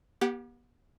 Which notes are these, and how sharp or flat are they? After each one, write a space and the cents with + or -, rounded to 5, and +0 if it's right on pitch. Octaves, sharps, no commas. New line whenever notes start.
B3 -40 G4 +0 F#5 +0